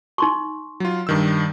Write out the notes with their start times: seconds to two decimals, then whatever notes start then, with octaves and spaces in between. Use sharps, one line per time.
0.18 D#4 C6 C#6
0.80 F#3 F4
1.07 G2 D#3 E6